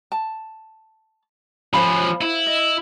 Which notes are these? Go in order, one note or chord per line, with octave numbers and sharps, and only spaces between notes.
A5
F3 C#4 C5 F5 B5
E4
D#5